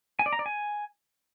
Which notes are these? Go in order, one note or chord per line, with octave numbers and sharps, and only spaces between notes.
G#5
D5
A#5
D5
G#5